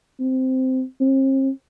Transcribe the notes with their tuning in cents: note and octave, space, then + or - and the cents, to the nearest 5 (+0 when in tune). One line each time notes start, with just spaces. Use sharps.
C4 -10
C4 +40